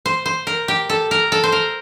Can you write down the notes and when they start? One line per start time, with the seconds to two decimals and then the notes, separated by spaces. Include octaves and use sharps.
0.06 C5
0.26 C5
0.47 A#4
0.68 G4
0.89 A4
1.11 A#4
1.32 A4
1.44 C5
1.52 A#4